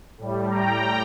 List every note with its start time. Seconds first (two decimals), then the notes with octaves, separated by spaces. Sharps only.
0.18 A2 G3
0.50 G5 A#5